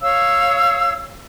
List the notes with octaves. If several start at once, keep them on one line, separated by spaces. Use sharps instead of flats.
C#5 F5 E6